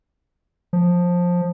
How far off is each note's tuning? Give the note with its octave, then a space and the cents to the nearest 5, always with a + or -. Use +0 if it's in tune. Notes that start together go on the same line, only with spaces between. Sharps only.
F3 +15